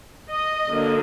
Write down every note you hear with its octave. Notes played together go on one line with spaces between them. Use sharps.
D#5
D3 F#3 A#3 D4